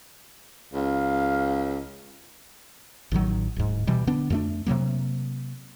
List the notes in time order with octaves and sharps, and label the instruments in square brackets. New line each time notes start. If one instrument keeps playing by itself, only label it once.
[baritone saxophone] C#2 [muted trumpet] F5
[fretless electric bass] A1 A2 D#3 F#3
D1 G#2
B2 E3 G3
D3 B3 D4
F2 A3 D4
C3 F3 F#3 A#3